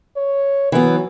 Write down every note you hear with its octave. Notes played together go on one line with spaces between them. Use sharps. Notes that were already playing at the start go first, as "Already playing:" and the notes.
C#5
E3 F#3 B3